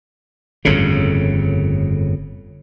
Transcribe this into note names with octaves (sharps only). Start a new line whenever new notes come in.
G1 F2 A2 C#3